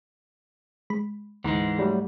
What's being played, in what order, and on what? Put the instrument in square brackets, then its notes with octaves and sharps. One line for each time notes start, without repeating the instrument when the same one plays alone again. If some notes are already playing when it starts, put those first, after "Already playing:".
[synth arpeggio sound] G#3 B5
[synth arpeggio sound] D2 [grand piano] G#2 [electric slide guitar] E3 G#3
[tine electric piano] F#3 G3 A3